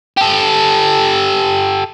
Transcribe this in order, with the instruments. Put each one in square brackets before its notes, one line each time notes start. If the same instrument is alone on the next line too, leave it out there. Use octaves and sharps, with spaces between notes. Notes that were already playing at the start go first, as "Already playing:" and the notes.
[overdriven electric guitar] G4 A4